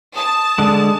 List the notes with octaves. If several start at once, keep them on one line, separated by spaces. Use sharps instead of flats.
A5 D#6
D3 G#3